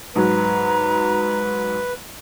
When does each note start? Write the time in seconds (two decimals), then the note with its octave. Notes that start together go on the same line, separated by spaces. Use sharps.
0.16 G#2 F#3 B4 A#5